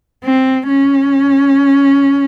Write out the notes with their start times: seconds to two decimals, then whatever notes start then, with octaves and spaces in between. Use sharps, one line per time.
0.24 C4
0.67 C#4